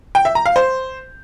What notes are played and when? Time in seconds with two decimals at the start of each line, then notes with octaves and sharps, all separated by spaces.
0.15 G5
0.25 E5
0.35 A#5
0.46 F5
0.56 C5